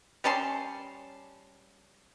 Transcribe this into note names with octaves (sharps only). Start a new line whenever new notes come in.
G3 C#4 A5 C6